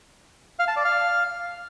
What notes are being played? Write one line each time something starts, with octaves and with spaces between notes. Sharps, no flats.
F5
A5
D5
F5